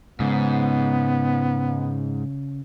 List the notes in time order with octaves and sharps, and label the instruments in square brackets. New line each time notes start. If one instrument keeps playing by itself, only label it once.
[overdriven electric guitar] G#2 [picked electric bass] C#3 [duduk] B3